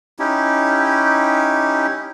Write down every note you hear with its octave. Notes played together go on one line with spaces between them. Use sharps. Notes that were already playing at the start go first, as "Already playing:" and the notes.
C#4 D#4 E4 G4